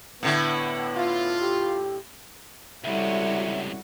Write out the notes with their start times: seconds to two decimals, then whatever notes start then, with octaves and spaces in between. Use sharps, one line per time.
0.23 A2 D3 B3 E4
0.96 F4
1.41 G4
2.84 C#2 C3 G3 E4 F#4 A4 C#5 E5